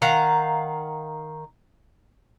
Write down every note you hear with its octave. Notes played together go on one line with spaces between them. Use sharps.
D#3 F5 F#5 A#5